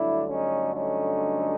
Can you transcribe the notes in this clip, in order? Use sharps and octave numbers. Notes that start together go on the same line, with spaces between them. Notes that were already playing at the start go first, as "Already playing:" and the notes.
Already playing: G2 D3 F#3 A3 D4 E4
C#4 D#4
C#4 D#4